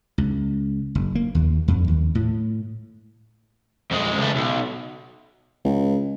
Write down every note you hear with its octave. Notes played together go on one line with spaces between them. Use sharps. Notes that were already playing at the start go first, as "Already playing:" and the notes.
C#2
F#1
A#3
D#2
F2
D#2
A2
F2 G#3
C#2 A3
B1
C#2